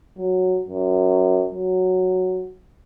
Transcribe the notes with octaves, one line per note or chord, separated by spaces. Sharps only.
F#3
F#2
F#3